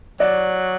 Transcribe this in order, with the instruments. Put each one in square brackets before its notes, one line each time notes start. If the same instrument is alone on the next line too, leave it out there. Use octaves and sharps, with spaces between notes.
[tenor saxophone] F#3 [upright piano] D5